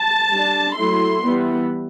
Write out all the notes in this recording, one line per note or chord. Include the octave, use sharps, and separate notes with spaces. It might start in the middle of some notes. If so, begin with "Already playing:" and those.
Already playing: A5
G3 D4
F#3 A3 E4 C6
E3 G3 B3